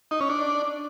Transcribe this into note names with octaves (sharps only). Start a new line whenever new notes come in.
D#4
C#4
D4